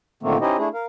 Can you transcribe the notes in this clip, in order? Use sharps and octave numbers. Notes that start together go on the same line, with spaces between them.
A#2 D3 D#3 A3 A#3 C4
C#4 D#4 E4 G4 C5 D#5
A3 D4 E4 G#4
A#4 F5